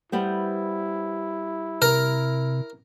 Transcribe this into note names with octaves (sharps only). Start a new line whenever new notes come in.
G3 B3 E4 C5
C3 A#4